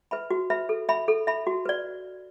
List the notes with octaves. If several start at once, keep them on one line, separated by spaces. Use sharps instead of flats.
B4 E5 B5
F#4
B4 E5 B5
A4
E5 B5
A4
E5 B5
F#4
B4 D5